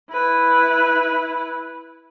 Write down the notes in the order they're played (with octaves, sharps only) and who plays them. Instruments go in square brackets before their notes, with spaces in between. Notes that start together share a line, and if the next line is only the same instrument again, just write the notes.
[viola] E4 B4